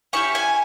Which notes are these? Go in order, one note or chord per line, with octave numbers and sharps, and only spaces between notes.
C#4 E4 G4 C#6
G#5